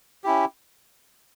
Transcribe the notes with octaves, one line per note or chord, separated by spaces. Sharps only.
C#4 E4 G4